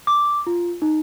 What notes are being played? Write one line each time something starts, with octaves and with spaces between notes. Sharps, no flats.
D6
F4
D#4